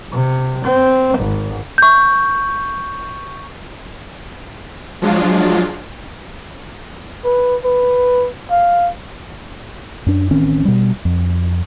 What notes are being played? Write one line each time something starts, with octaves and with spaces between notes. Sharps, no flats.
C3
C4
G#1
C#6 G6
F3 F#3 G#3 D4 F4
B4
B4
F5
F#2 D4
A1 D#3 C4 C#4
B2 G3
F2